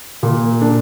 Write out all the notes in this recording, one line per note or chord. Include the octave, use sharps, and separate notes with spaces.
A#2
D4